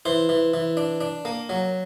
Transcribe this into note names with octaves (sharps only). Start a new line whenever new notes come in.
E3 C5
E3
E3
D4
D4
A#3
F#3